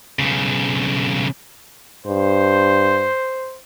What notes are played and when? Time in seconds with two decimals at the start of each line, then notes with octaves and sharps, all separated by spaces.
0.19 B1 C#3
2.06 G2 C5